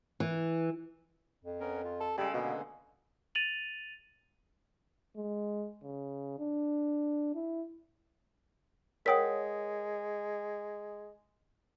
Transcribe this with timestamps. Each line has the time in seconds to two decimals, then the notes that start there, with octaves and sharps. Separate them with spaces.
0.20 E3
1.44 F2
1.60 B3 C#4 A#4
1.84 F4
2.00 A4
2.18 C#3 G3 G#3 A4 A5 B5
2.33 B2 D3 A#3 B3
3.35 A6 D#7 F7 F#7
5.17 G#3
5.83 C#3
6.39 D4
7.35 E4
9.06 G#3 A#4 C#5 F#5 G5 D#6 B6